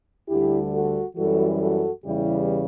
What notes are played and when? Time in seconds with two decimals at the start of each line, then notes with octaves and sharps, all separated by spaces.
0.29 D2 D3 G3 E4 G4
0.73 F#4 A4
1.17 F#2 E3 G3 F#4 A4
1.61 F#4 A4
2.04 E2 C#3 E3 G3 E4 G4